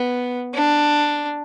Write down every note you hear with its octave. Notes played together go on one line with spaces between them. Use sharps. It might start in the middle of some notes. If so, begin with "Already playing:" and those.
Already playing: B3
D4